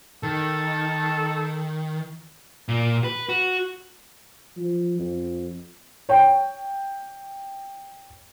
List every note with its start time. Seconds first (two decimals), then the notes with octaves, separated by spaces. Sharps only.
0.23 D#3 A4
2.68 A#2
3.04 B4
3.29 F#4
4.57 F3
4.99 F2
6.09 C#5 G5